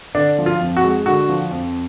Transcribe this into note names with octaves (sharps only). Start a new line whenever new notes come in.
D3 D4
F3
F4
F2
F#4
G#3
D3 F#4
F3
F2